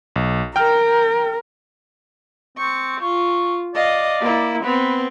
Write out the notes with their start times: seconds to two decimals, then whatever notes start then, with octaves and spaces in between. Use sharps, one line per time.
0.16 B1
0.56 A#4 G5 F6
2.57 C4 C#6
3.01 F4 C#6
3.75 D5 D#5 F5
4.21 A#3 E4
4.64 B3 C4 B4